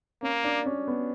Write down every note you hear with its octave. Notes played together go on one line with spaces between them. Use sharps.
A#3 C#4
D4
C#4
B3